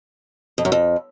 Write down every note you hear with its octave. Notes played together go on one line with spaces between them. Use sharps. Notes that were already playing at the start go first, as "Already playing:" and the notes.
F2
F#2
F2